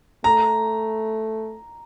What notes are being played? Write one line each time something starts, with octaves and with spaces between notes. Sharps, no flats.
A3 A#5